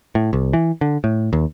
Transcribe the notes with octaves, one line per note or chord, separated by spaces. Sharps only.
A2
C2
E3
D3
A2
D#2